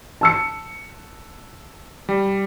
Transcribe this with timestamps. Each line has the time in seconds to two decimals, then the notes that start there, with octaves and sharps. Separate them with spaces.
0.21 A5 E6 C#7
2.09 G3